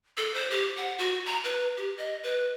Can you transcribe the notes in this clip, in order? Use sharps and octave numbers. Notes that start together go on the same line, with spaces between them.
A4
C5
G4
F#5
F#4
A#5
B4
G4
D#5
B4